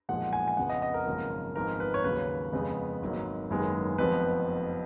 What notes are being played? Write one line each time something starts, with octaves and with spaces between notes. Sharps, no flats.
B1 A#2 F3 G#3 F#5
G#5
G#5
F2 C#3 F3 B3 F#5
D#5
D#5
A#4
G#1 F#2 C#3 F3 A#3 A#4
G#1 G#2 F3 B3 A#4
B4
C#5
D#2 C#3 F#3 A#3 B4
F2 C#3 G#3 B3
G#1 G#2 F#3 A#3
F#1 F#2 D#3 G#3 B3
F1 F2 F3 B3 B4